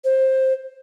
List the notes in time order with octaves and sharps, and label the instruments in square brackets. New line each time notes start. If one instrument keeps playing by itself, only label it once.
[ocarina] C5